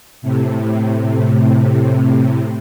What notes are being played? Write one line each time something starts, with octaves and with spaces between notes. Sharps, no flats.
A2 C3